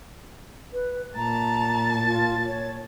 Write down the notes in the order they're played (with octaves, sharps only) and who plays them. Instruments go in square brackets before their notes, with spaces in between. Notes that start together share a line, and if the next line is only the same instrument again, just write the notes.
[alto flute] B4
[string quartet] A#2 A5 A6 [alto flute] A#5
[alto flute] F4
C#5